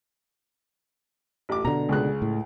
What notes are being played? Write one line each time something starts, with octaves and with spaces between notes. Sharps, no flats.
A1 D6
B2 D3 A#5
C#2 C#3 F#6
A2